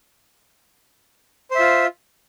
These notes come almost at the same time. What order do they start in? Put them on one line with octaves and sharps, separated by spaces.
C5 E5 F4